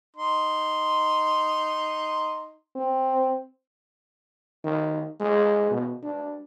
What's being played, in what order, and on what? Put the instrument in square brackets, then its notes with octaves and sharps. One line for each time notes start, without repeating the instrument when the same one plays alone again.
[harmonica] D#4 C6
[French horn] C4
[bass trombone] D#3
G#3
B2
D4